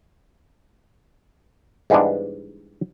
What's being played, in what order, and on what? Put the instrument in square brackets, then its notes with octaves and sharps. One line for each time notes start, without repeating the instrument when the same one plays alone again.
[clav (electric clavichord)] G#2 E3 G3 G#3 B3 D4